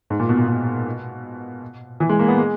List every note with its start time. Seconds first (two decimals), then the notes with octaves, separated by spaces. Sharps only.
0.10 G#2
0.19 A#2
0.29 B2
0.39 A#2
0.48 B2
2.00 E3
2.09 G#3
2.19 A#3
2.28 B3
2.38 G#3